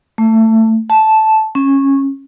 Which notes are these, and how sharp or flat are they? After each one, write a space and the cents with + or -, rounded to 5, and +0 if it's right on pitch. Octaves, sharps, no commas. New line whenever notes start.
A3 +20
A5 -10
C#4 -15